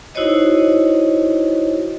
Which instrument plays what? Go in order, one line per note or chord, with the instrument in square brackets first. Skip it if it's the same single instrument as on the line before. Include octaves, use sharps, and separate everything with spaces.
[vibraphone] D#4 E4 F#4 C5 C#5 D#5